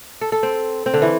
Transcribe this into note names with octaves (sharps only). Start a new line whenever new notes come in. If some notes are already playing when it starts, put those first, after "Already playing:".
A4
A4
C4
C4
D3
E3